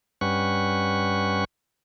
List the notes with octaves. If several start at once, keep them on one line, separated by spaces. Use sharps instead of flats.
G2 G3 C#4 B4 F#5 C#6